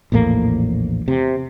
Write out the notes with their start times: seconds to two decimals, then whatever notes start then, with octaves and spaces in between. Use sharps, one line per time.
0.12 A#1 E2 A2 A#3
1.08 C3